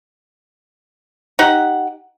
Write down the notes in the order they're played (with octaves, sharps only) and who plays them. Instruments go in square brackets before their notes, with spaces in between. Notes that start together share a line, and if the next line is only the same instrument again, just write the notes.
[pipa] D#4 G4 F#5